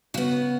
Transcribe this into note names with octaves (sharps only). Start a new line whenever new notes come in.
C#3 B3 F#4